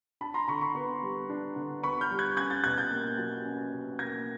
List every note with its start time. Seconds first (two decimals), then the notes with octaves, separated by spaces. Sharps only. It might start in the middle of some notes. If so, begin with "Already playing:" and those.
0.21 D4 A5 B5
0.34 A#5 C6
0.48 D3 B5 C#6
0.61 B5 C#6
0.75 B3
1.02 G3
1.30 D4
1.56 D3
1.83 B3 B5 C#6
2.01 F6 G6
2.11 G3
2.19 F#6 G#6
2.37 C#4 F#6 G#6
2.50 G6 A6
2.64 B2 F#6 G#6
2.78 G6 A6
2.91 A#3
3.18 F#3
3.45 C#4
3.72 B2
3.99 A#3 G#6 A#6